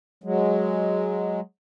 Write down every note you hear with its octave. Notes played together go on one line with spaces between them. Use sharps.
F#3 G#3